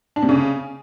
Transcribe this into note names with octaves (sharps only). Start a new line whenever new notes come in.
D4
C3
C#3